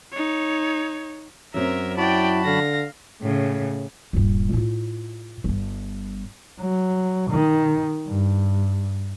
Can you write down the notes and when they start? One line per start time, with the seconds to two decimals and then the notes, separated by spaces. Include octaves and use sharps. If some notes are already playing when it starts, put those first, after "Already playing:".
0.12 D#4 C#5
1.54 F#2 F#3 C4 A#4 E5
1.97 E4 F#4 D5 G5 A5 B5
2.45 D3 F5 A#6
3.22 A2 C#3
4.13 D#1 G2
4.53 A2 F4
5.44 G1 G2
6.60 F#3
7.30 D#3
8.07 G2